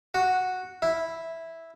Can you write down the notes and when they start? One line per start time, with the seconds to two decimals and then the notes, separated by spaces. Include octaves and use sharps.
0.14 F#4
0.82 E4